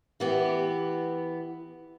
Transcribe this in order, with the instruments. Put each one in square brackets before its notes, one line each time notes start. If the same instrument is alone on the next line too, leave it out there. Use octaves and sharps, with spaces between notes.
[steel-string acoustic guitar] E3 B3 G4